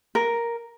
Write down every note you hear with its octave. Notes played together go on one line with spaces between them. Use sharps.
A#4